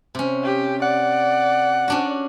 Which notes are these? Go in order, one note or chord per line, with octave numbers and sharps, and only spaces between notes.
C3 C#4
G4
D5 F#5
C#4 D4 F#4